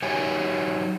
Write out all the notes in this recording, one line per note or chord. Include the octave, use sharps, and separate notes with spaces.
F#3 D#4 G4 C#5 G#5